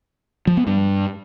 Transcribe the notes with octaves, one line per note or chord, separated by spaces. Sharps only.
F3
B3
G2